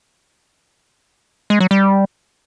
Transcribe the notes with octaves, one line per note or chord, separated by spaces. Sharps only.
G#3
F#3
G3